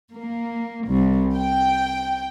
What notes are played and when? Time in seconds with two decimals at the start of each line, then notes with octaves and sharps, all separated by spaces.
0.14 A#3
0.88 C2
1.37 G5